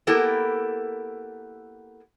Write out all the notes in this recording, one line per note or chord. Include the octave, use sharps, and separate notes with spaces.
A#3 B3 E4 G4 A4 A#4